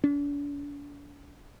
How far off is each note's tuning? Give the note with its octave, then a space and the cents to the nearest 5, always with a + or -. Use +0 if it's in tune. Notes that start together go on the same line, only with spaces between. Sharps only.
D4 -40